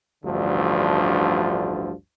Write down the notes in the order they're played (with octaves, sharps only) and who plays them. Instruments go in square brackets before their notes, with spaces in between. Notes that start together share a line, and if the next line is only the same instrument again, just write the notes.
[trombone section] A1 D2 G2 D3 F3